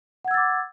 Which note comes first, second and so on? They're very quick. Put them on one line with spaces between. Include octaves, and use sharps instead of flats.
F#5 G#6 E6 A6 D6